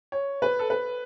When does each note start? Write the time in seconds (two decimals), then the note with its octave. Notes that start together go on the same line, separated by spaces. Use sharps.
0.12 C#5
0.42 B4
0.59 A4
0.70 B4